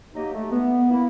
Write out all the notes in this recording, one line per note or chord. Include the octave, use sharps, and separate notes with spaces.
F#3 A#3 D#4 G4 D#5
A3
B3
A#3 E4